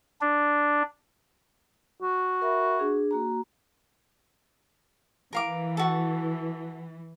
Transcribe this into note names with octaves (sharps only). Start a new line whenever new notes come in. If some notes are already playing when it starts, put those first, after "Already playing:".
D4
F#4
A#4 E5 B5
D4 G#4
A#3 F#4 A#5
E3 A#4 F5 D6
F#4 A4